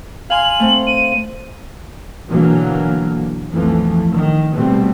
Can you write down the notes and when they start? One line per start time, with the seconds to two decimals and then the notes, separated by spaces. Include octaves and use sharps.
0.30 F5 G#5 C6 F#7
0.60 A3 C4
0.86 D#7
2.29 B2 D3 E3 F#3 A#3
3.51 B1 F2 E3 F3 A3
4.11 D#3
4.55 B2 G3 A3 C4